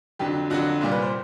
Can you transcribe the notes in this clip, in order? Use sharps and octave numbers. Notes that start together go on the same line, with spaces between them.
F2 D3 F#3 G4
F2 D3 F#3 F#4
C2 A#2 G3 F4
B4
C5